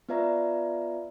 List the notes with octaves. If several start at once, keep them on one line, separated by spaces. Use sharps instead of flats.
B3 F4 B4 D5 E5 A#5